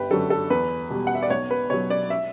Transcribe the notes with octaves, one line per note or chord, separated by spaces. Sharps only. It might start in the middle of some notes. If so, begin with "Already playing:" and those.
Already playing: G1 G4 B4
F#2 D3 F#3 A4
A4
E2 B4
B2 G3
F#5
E5
D5
B1 C#5
B4
B2 F#3 C#5
D5
E5